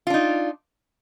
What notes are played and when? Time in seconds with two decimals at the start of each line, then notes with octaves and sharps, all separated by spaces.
0.07 F4
0.10 D4
0.14 D#4